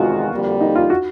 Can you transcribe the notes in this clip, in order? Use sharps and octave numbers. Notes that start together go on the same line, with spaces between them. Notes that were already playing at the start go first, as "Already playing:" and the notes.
Already playing: E2 C3 D#3 G#3 F4 F#4
F2 D3 G3 A#3
D#4
F4
F#4